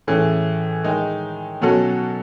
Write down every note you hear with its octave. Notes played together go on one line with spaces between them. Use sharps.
A2 E3 A3 C#4 G#4
D#3 G#3 D#4
B2 F#3 C#4 F#4 A4